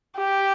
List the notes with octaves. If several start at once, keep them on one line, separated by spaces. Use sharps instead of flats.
G4